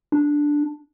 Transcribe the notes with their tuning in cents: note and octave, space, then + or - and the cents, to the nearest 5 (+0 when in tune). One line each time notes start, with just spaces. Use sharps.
D4 +0